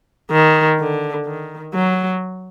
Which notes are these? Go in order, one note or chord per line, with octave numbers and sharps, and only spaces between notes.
D#3
D3
D#3
F#3